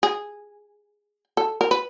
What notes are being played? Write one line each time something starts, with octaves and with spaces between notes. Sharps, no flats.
G#4
A4
A#4
B4